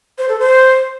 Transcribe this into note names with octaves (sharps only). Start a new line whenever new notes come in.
C5
A4
C5